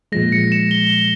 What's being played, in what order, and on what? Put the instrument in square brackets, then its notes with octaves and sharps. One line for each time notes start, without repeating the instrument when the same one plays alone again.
[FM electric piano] A#2 F3 G#3 [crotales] A#6
[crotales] C#7
E7
G7